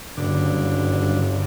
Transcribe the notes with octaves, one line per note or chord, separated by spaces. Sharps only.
F#1 G2 D3